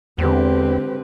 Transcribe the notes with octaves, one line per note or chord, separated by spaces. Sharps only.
E2 D3 G#3 C4 G4 B4